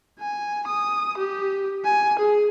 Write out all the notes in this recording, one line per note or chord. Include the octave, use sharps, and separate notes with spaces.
G#5
D#6
G4
G#5
G#4